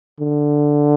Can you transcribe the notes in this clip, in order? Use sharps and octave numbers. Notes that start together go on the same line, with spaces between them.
D3